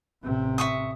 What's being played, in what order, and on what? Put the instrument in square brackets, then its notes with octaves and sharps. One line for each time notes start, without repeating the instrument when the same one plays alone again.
[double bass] A1 C3
[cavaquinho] E5 C#6 D#6